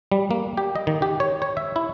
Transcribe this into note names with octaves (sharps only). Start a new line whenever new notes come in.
G3
A#3
G4
D#5
D#3
G4
C#5
C#5
E5
E4